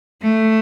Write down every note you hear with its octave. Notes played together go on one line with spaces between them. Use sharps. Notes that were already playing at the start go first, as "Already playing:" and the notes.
A3